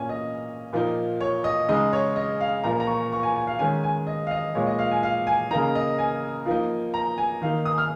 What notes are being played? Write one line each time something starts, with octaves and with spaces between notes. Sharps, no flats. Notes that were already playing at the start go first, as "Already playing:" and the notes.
Already playing: A#2 A#3 C#4 G#5
D#5
A#2 F3 A#3 D#4
C#5
D#5
C#3 G#3 D#4 D#5
C#5
D#5
F5
A#2 F3 A#3 A#5
A#5
C#6
C#6
G#5
G#5
F5
D#3 G#3 C#4 G#5
G#5
D#5
F5
D#5
A#2 F3 G#3 C#5
D#5
F5
G#5
F5
G#5
C#3 A#3 D#4 A#5
D#5
G#5
F3 A#3 D#4
A#5
G#5
D#3 A#3 D#4 F5
D#6
F6